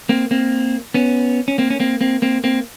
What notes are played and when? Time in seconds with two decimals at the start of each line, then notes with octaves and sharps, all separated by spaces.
0.09 A#3 C4
0.31 A#3 C4
0.94 B3 C#4
1.48 C#4
1.58 A#3 C4
1.70 C#4
1.80 A#3 C4
2.01 A#3 C4
2.22 A#3 C4
2.44 A#3 C4